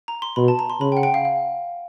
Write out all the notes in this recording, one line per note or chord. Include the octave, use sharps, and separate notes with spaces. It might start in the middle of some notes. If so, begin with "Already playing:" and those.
A#5
C6
B2 B5
A5
A#5
C6
C#3 B5
G5
F#5
G5
F5
F5